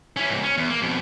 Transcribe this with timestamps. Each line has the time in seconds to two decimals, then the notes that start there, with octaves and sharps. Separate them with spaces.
0.16 C#4 E4
0.29 C#2 G#2
0.43 C#4
0.58 E2
0.70 A#3
0.82 F2 B2